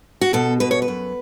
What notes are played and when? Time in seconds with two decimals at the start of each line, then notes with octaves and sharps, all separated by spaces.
0.21 F#4
0.33 B2 A4
0.60 B2 B4
0.71 C#5
0.82 B4
0.88 F#2